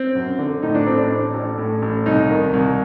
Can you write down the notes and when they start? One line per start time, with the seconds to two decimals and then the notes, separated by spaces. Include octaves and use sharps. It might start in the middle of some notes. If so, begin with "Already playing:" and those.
Already playing: C4
0.15 F#2
0.39 D3
0.63 A2 D#4
0.75 D4
0.86 A1 C4
0.98 D4
1.10 A1
1.34 A1
1.58 A2
1.82 A1
2.06 C2 D#4
2.30 D#3
2.53 C2